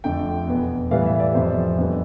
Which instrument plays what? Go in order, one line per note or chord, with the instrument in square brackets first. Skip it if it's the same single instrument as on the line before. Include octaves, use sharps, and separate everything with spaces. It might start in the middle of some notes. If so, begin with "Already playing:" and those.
[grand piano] F2 D3 F3 A3 G5
E2 B2 B3
A2 E3 G3 B3 F5
E5
D5
F2 C3 F3 C5
F2 D3 G3 B3